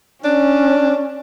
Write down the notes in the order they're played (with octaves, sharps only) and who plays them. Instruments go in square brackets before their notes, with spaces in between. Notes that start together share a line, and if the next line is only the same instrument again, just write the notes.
[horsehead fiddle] C#4 [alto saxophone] D4